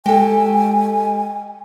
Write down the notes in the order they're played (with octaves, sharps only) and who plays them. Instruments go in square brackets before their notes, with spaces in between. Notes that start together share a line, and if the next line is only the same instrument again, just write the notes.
[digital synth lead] G#3 [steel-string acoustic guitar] G4 A4 [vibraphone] G5 [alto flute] G#5